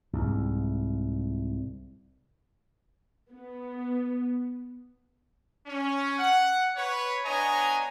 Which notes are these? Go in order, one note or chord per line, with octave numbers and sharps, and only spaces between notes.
C2 G#2
B3
C#4
F#5
B4 C#5
B3 D4 C#5 D#5 G#5 A#5